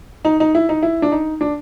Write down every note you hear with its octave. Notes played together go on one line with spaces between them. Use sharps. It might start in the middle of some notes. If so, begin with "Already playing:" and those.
D#4
D#4
E4
D#4
E4
D4
D#4
D4